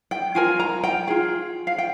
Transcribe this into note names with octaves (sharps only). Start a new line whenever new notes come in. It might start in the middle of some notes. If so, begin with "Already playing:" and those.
G5
F4 A#4 G#5
A#5
G5
F4 G#4
F5
G5